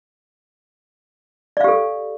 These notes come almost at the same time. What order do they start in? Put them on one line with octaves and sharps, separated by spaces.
D5 F5 G4 A4